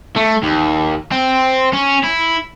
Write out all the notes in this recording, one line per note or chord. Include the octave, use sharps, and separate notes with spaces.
A3
D#2
C4
C#4
E4